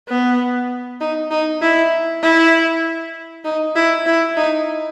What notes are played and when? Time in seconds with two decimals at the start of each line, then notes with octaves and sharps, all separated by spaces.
0.08 B3
1.00 D#4
1.31 D#4
1.62 E4
2.22 E4
3.45 D#4
3.75 E4
4.06 E4
4.37 D#4